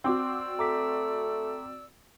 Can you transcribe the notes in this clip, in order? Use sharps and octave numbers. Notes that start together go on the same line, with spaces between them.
C4 F#4 D5 C6 D6 E6
A3 A#5 D6 B6